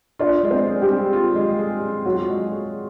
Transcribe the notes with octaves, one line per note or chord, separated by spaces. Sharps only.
D4 F4 D5
G#3
C4 C5
G#4
G3 G4
C4
F4
G#3
G#4
C4
F#3 F4 F#4
G#3
G#4